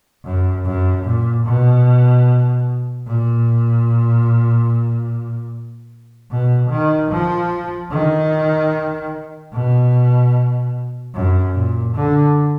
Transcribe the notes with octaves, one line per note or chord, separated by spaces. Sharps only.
F#2
F#2
A#2
B2
A#2
B2
D#3
F3
D#3
B2
F#2
A#2
D3